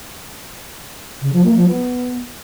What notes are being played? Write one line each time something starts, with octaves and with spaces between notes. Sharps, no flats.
C#3
F3
A#3
F3
B3